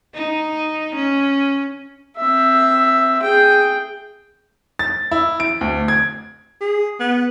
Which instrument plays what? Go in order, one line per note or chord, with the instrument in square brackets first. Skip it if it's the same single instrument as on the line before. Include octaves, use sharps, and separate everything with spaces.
[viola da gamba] D#4
C#4
[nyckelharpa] C4 E5
G#4 G5
[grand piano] A6
E4
D7
D2
G#6
[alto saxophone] G#4
B3